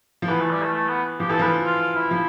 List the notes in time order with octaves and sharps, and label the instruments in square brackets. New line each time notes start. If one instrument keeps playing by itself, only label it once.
[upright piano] F3
[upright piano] E3 [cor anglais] B3
[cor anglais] A3
G3
A3
A3
B3
[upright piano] F3 [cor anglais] G4
[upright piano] E3 [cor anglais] A4
[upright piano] F3 [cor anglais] B4
[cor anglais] F4
F4
E4
[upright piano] F3